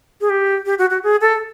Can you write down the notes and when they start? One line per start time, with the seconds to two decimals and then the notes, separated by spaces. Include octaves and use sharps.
0.21 G#4
0.30 G4
0.66 G4
0.79 F#4
0.90 F#4
1.03 G#4
1.21 A4